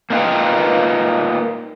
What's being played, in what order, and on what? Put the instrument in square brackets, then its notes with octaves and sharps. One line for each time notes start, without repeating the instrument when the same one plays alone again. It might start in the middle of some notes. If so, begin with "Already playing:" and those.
[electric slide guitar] A#3 C4 D#4 F4 B4 G5